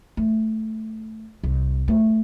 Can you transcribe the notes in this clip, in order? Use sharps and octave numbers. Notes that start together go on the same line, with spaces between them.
A3
C2
A3